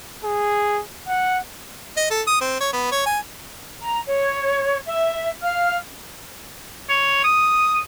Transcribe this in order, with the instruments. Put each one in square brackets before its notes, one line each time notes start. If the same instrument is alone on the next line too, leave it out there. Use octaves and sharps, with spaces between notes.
[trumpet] G#4
F#5
[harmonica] D#5
A4
D#6
C4
C#5
B3
C#5
G#5
[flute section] A#5
C#5
E5
F5 F6
[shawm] C#5
D#6